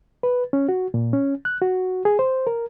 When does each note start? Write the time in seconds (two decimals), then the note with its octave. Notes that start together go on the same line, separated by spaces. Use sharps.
0.23 B4
0.53 C#4
0.69 F#4
0.94 A#2
1.13 C#4
1.45 F#6
1.62 F#4
2.05 G#4
2.19 C5
2.47 A#4